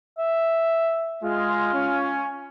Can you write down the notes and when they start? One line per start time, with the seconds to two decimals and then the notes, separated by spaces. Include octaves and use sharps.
0.18 E5
1.24 G#3 F4
1.74 C#4